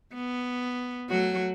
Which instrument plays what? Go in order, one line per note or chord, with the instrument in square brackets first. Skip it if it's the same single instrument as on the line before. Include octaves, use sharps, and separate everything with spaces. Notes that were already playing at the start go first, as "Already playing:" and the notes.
[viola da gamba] B3
F#3 A3 F#4